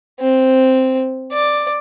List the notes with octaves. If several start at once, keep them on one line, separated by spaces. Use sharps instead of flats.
C4
D5